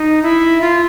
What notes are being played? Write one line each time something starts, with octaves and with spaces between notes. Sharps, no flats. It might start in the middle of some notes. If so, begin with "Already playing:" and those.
Already playing: D#4
E4
F4